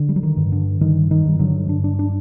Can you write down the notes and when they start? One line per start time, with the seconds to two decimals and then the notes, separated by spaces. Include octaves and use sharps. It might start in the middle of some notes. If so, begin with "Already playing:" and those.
Already playing: D3
0.09 G3
0.16 F#3
0.23 D#3
0.37 G2
0.52 D3
0.81 G2 D#3
1.11 D#3
1.25 G2 G3
1.39 D3 F#3
1.68 G2 D4
1.84 D4
1.99 D4